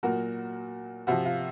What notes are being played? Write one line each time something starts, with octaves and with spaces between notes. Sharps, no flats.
A#2 F#3 F#4 A#4
C3 F3 F#4
F4